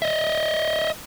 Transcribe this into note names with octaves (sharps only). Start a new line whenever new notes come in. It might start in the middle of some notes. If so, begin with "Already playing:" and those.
D#5 E5